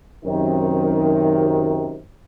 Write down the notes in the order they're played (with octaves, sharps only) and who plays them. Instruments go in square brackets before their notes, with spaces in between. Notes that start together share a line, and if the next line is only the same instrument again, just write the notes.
[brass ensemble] F#2 C3 D#3